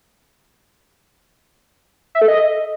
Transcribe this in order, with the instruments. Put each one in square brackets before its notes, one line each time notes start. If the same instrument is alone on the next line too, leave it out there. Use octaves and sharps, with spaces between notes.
[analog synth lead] E5
A4
D#5